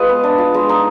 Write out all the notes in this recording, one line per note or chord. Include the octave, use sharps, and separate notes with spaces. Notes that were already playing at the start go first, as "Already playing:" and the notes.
Already playing: G#3 F4 B4 D#5 F5
B3
D4
F4
G#3
D#4